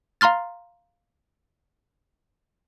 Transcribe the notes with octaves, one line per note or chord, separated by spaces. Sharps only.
F5 A#5 C6 F6 A6